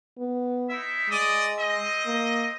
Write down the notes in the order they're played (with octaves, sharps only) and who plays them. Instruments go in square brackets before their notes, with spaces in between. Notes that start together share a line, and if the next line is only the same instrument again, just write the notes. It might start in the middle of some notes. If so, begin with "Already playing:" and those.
[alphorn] B3
[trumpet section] D#4 E4 E5
[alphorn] G#3 [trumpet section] D5 D#5 D#6
[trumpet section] C4 D#5
[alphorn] A#3